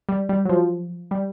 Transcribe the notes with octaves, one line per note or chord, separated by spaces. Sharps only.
G3
G3
F#3
F3
G3